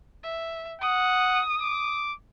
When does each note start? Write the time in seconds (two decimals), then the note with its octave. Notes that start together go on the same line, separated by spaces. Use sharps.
0.24 E5
0.81 F#5 D#6
1.61 D6